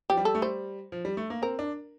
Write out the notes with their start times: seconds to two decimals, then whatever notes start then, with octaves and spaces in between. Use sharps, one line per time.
0.10 F3 G4
0.17 G3
0.25 A4
0.35 A3
0.42 G3 C5
0.92 F3
1.05 G3
1.17 A3
1.30 A#3
1.42 C4 A#4
1.59 D4